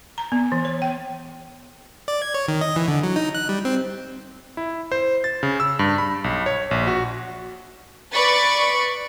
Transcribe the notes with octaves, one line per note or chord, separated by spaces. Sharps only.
A#5
B3
E3
C#5
G5
D5
G#6
C#5
D#3
D#5
E3
D3
F#3
D#4
F#6
G3
C4
E4
C5
A6
C#3
E6
G2
B5
B1
C#5
A#1
F#4
B4 D5 B5 C#6 A6